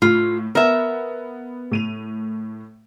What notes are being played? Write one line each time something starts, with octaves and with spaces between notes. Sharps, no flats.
A2 F4
B3 A#4 E5
A2 D#7 F7